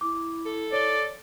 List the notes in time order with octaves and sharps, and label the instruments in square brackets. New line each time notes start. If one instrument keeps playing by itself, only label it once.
[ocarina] E4 [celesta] D6
[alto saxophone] A4
[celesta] C#5 G7 [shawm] D5